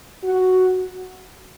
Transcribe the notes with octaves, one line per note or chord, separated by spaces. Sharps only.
F#4